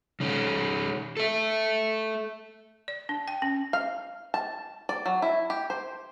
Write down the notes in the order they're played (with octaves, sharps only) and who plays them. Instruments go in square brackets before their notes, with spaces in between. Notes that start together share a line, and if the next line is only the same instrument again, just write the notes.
[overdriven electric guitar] D#3 C#4
A4 E5
[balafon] D5
D4
G5
C#4
[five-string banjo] F5
A5
D5
F#3
E4
G4
C5